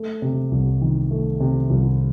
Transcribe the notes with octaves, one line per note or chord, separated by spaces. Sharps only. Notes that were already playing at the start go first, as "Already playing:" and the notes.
Already playing: A3
C3
C2
D#3
A3
C3
C2